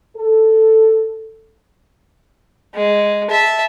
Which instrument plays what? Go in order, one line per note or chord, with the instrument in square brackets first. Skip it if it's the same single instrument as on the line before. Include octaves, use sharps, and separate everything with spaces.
[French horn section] A4
[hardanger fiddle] G#3
E5 A5